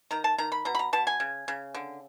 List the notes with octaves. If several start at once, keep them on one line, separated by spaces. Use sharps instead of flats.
D#3 A#5
A5
D#3 A#5
B5
B2 A#5
B5
A#5
B2 A5
G#5
C#3
C#3
D3